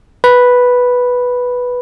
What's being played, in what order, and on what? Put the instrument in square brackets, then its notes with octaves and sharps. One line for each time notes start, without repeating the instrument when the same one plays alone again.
[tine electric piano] B4